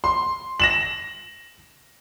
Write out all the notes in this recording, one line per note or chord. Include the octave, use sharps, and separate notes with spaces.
C6
A#6 E7 F#7